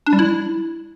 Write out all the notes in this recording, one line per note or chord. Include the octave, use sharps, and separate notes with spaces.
D4
G3
E4